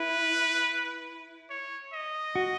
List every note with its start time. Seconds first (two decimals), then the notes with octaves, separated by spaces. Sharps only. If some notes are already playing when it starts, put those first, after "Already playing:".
Already playing: E4 B4
1.50 C#5
1.93 D#5
2.35 F#4